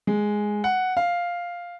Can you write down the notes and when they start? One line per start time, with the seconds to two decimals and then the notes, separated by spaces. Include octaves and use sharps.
0.07 G#3
0.64 F#5
0.97 F5